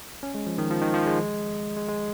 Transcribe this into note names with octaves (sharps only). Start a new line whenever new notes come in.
C#4
G#3
F3
D#3
F3
D#3
F3
G#3
G#3
G#3